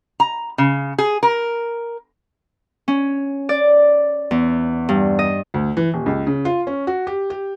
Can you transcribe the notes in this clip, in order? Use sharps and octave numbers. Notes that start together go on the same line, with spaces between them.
A#5
C#3
G#4
A#4
C#4
D5
E2
G2
D#5
D2
E3
D#1
C#2
C#3
F4
C#4
F#4
G4
G4